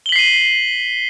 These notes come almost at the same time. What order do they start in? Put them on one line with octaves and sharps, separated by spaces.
G7 F#7 B6 C7 D#7